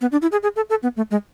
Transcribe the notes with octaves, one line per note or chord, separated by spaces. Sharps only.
B3
D4
E4
G#4
G#4
A4
A4
B3
A3
G#3